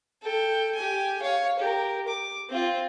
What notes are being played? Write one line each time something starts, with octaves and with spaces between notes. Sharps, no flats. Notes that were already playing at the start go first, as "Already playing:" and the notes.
A4 G5
G4 G#5
C#5 F5
G4 A#4
D6
C4 F4